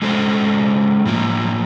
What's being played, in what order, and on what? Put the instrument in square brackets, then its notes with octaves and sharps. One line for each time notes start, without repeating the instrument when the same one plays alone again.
[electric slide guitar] G#3 C#4 F#4 A4 C5
A2 F3 A#3